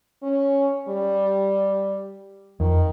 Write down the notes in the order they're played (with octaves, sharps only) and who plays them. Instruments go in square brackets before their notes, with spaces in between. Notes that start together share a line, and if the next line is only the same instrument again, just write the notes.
[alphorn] C#4
G3
[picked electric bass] F2 [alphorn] D#3